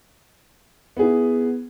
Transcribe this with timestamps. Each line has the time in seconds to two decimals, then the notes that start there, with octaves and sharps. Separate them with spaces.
0.97 B3
0.99 G#4
1.02 E4